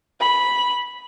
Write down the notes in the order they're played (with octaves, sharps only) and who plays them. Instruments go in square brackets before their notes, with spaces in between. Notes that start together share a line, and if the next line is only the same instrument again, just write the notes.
[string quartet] B5